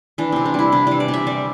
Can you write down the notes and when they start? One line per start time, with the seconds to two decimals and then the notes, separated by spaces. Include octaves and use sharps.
0.18 E3 D4
0.32 C3 C4
0.46 D4
0.54 G3 E4
0.72 C3 D4
0.87 E3 D4
1.00 D5
1.08 C3
1.14 E5
1.27 G3 D5